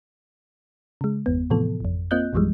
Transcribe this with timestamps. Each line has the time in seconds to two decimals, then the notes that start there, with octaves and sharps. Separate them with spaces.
1.01 C#3 G#3
1.26 G1 E2 B3
1.50 A2 C3 E3 F3 B3 A4
1.80 G#1 F2
2.11 A#3 C4 F4 D#5 F#6 G6
2.33 A#1 F#2 E3 F3 G3 G#3